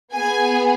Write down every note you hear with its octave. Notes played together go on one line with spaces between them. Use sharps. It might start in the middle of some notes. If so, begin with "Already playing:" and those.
B3 G#4 G#5